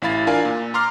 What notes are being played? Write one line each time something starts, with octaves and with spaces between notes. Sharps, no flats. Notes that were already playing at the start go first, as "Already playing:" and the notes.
A1 E4 F5 B5 A6
D4 F4 A#4 D5 F5 G#5
A#2
A#5 C6 D6 F6 C7